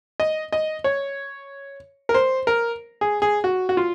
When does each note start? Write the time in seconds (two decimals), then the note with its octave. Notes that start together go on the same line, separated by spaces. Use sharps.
0.20 D#5
0.52 D#5
0.84 C#5
2.09 A#4
2.14 C5
2.47 A#4
3.01 G#4
3.22 G#4
3.44 F#4
3.69 F#4
3.77 F4